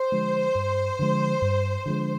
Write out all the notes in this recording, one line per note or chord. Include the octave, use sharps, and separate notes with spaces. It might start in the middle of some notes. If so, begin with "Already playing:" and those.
Already playing: C5
D3 F3 G#3
G2
D3 F3 G#3
G2
D3 F3 G#3